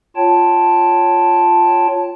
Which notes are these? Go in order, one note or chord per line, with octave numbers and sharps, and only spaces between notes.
F4 C#5 G5 A5